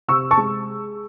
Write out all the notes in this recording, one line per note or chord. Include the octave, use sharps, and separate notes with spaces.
C3 C#6 E6
A5 C#6
G#3